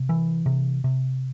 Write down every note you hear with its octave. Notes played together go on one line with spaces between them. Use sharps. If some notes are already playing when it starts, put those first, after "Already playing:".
Already playing: C3
E3
C3
C3